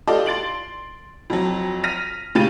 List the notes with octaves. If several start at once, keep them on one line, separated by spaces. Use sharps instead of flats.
F4 G4 A4 D5 D#5
C6 A6 D7 F#7
F2 F#3
F6 A#6 B6 D#7
A#2 C#3 G4 B5 A6 D#7